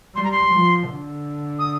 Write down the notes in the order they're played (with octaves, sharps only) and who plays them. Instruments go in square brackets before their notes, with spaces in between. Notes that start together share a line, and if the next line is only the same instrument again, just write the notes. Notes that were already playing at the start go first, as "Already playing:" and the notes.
[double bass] G3 [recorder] C6
[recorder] A#5
C6
[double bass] F3
D3
[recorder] D#6